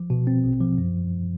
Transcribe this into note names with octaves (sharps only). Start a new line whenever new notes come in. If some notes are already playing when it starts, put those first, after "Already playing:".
Already playing: F3
B2
C4
A#1
F3
F#2